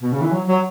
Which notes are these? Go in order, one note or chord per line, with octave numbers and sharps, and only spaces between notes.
B2
C#3
E3
F#3
F#3